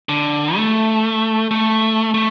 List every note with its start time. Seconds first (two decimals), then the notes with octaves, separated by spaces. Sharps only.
0.09 D3
0.56 A3
1.51 A3
2.14 A3